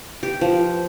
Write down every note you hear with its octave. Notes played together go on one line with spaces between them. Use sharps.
G4
F3